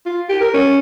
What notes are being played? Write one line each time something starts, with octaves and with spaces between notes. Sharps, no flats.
F4
G4
A#4
C#4